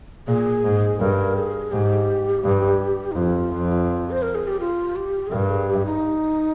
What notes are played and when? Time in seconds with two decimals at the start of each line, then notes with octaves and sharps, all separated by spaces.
0.28 A#2 G#4
0.64 G#2
0.99 G2 A#4
1.36 G#4
1.72 G#2 G4
2.44 G2
3.12 D#4
3.16 F2 F4
3.52 F2
4.10 C5
4.22 A#4
4.35 G#4
4.47 G4
4.60 F4
4.96 G4
5.27 G#4
5.32 G2 A#4
5.50 G#4
5.68 G4
5.86 D#4